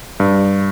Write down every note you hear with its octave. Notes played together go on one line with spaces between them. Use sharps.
G2